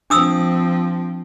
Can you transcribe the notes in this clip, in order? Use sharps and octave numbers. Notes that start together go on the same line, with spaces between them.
F3 C4 D4 D#6 E6